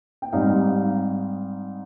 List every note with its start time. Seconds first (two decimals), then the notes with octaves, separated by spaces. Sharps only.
0.22 G5
0.33 G#2 G3 C4 D#4 F5